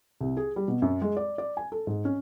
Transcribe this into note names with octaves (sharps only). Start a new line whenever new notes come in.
C2
G#4
G3
B2
F#2
G#3
D5
D5
G#5
A4
G#2
C#4